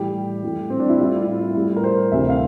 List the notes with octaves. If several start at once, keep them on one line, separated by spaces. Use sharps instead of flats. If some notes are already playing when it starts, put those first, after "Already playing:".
Already playing: A2 E3 G3 G4
A2 E3 G3
C4
D4
E4
A2 G3 F4
F4
E4
A2 G3
A#4
C5
D2 C3 E3 G3 E5
F5